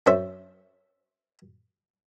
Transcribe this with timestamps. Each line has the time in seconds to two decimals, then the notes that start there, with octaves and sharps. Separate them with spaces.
0.06 F#2 C#4 C5 E5